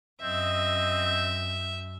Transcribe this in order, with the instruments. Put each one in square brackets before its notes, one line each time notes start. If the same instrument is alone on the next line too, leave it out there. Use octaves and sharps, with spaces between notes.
[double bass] F#2 [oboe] C4 [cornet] D#5 [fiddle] E5